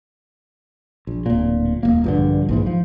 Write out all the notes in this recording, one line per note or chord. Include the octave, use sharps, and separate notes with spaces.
A#1
D1 A#2
D#1 C#2 A#3
A#1 G2 D3
A#1 G#2 E3
F3